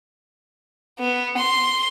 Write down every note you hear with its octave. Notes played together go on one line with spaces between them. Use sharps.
B3
C6